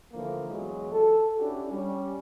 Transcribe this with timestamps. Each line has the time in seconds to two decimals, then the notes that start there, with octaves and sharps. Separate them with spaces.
0.13 D3 E3 F3 A3 A#3
0.50 E2 F#3 G#3
0.92 A4
1.38 C#4 D4 E4 F#4 G4
1.69 G3 C#4